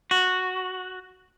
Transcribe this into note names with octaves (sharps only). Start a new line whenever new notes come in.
F#4